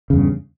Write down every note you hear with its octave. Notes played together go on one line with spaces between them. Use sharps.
E2 G2 C#3